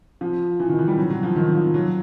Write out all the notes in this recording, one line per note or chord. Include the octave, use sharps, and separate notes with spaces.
F3
E3
D#3
E3
G3
F#3
F#3
F3
D#3
F3
F#3